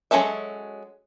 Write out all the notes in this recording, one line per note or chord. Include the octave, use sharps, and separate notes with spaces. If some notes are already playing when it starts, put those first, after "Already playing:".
F#3 G#3 C#4 A4 E5